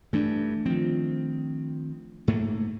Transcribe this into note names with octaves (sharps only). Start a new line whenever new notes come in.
G2 E3 A3 D4
D#3 F3 C4
G#2 A3 A#3